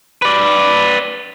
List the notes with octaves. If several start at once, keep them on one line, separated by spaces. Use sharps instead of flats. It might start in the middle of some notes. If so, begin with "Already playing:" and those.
B4 D5